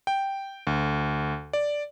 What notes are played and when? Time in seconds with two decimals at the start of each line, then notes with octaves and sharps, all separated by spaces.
0.07 G5
0.67 D2
1.53 D5